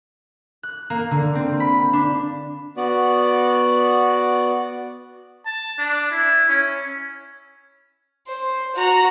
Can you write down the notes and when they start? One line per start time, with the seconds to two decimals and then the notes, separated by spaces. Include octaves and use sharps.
0.63 F#6
0.90 A#3
1.11 D3
1.35 C4
1.60 B5
1.93 D4
2.77 B3 F#4 D5
5.46 A5
5.78 D4
6.11 E4
6.49 C#4
8.27 C5
8.75 F#4 A#5